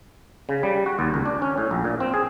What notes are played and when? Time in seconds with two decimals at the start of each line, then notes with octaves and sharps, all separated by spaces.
0.49 C#3
0.63 G3
0.86 F#4
0.99 D#2
1.14 C#2
1.26 D4
1.42 C#4
1.58 A2
1.71 A#1
1.84 A#2
2.00 C4
2.14 G#4